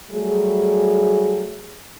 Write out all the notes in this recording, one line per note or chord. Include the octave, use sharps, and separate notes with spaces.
F#3 G3 A3 G#4